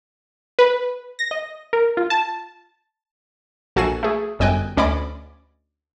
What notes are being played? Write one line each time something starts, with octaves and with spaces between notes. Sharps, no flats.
B4
A#6
D#5
A#4
F4
A5
A#1 F#4 A4 G#5 C7 E7
A3 G#4
G1 F#2 D#5 G5 G#5 F#6
D2 C#4 D5 D#5 B5 D6